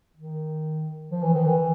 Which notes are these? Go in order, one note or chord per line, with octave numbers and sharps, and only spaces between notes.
D#3
F3
E3
D#3
E3